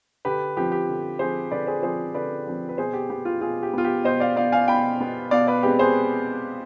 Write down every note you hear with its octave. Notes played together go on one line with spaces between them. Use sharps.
D3 G4 B4
F3 C4 G4
G4
D3
F3 C4 G#4 C5
D3 B4 D5
G#4 C5
F3 C4 G#4 C5
D3 B4 D5
F3 C4
B4
B2 G#4 C5
G4
B3 G4
F4
B2 F4 G#4
G4
B3 F4
G4
B2 C5 D#5
D5 F5
B3 D5 F5
F5 G#5
B2 G5 B5
B3
B2 D5 F5
B4 D5
G#3 C4 G4 B4
G#4 C5